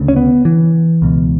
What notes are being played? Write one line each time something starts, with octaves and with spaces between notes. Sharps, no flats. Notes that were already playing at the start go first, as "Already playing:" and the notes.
Already playing: D2 C#3
C#4
B3
E3
C#2 B2